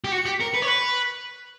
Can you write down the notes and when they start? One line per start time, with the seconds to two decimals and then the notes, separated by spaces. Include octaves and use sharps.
0.04 G4
0.12 F#4 C#7
0.26 G4
0.33 B6
0.40 A#4 C#7
0.54 B4
0.62 C#5
0.67 B4 B6